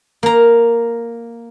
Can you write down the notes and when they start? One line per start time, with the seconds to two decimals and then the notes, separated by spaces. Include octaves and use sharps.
0.23 A#3 A#5